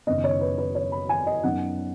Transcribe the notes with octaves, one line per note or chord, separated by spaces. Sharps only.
F#1 F#2 D#3 B3 D#5
C#5
B4
B4
C#5
B5
G#5
D#5
F#2 F#3 B3 D#4 F#5